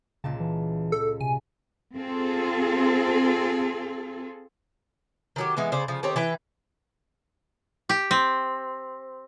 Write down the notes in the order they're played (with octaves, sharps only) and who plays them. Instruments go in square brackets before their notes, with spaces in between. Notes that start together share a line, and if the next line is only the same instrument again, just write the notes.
[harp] C#2 A#2 A5 [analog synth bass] C#3
[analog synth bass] E3
[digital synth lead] A4
[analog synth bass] C3 [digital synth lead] G#5
[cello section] C4 F4 G#4 A4
[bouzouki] D#3 F#3 G4
E3 G#3 B3
C#3 C5 D5
C#3 F3
D#3 C4 G4 C#5
E3 B4 G5
[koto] G4
C4